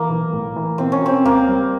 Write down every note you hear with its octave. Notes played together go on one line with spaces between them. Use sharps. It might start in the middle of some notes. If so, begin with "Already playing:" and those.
Already playing: E3 A#3
B1
A2
E3
B2 C4
C#4
B2 C4
C#2 A#3
G3